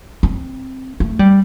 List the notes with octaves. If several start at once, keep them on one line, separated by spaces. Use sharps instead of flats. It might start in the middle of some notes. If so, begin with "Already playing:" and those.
C4
A3
G3